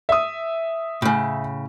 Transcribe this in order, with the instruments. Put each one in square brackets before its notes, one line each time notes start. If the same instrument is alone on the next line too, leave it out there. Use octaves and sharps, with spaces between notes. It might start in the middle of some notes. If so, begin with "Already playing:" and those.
[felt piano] E5 D#6
[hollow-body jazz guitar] A2 C#3